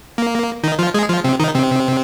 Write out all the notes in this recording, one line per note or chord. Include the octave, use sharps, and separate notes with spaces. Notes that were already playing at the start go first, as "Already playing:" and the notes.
A#3
D#3 D#4
F3 F4
G#3 G#4
F3 F4
C3 C4
D#3 D#4
C3 C4